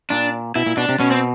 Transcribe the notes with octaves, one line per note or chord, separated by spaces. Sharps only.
A#2 D4
B2 E4
A#2
B2 D4
C3
B2 C#4
C4